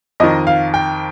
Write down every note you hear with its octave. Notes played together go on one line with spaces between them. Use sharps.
F2 D#3 D#5
F5
G5